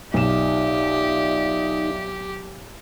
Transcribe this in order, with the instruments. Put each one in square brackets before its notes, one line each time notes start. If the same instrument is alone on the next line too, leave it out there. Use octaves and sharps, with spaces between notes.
[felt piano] B1 E7 [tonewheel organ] D#4 [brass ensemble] F4 D5 E5 [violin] G4